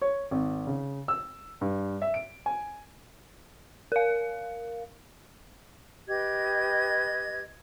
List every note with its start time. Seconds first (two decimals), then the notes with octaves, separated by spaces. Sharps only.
0.02 C#5
0.31 G#1
0.67 C#3
1.08 E6
1.61 G2
2.02 E5
2.14 D7
2.46 G#5
3.92 A#4 F5
6.07 G4 B4 D#5 G#6